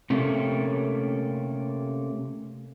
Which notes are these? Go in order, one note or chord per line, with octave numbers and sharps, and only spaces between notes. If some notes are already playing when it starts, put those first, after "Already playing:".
C3 A3 A#3 C#4